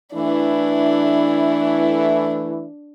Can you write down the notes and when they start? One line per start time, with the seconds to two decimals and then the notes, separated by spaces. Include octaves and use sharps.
0.14 E3 A3 D4 E4